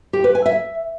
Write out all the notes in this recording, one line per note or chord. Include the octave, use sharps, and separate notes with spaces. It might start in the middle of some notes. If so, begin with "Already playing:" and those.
G4
B4
G#5
E5